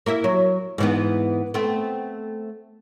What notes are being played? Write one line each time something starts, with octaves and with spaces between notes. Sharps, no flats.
A#3 E4 E5
F#3
G#2 E3 B3
A3 B3 C4